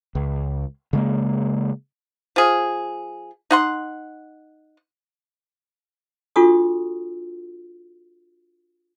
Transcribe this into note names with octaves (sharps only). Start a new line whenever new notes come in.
C#2
C#3 G#3 A#3
F3 G#4
D#4 F#5 C6
D4 F4 F#4 A4 C#6 D#6